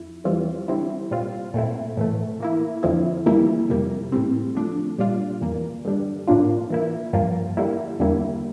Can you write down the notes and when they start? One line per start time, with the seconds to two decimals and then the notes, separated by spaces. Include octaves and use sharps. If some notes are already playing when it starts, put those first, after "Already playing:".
Already playing: F2 E4
0.24 E2 E3 G3 C4 F4
0.68 D3 G3 C4 E4
1.11 A#2 G3 C4 F4
1.54 A#2 A3 C4 E4
1.97 A2 E3 A3
2.40 E3 A#3 E4
2.83 F2 D3 F3 C4 E4
3.26 F2 E3 G3 A#3 E4
3.69 F2 C3 G3 A#3
4.12 A2 E3 G3 C4
4.55 D3 F3 A3 D4
4.98 A#2 G3 D4 F4
5.41 E2 E3 A#3
5.85 G2 D3 G3 D4
6.27 A2 F3 A#3 D4 F4
6.70 E3 A#3 E4
7.13 G2 F3 A#3 F4
7.57 D3 G3 A#3 E4
8.00 E2 D3 G3 A#3 E4